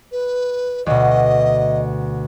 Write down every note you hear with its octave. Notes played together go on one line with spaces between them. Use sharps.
B4
D2 B2 D#5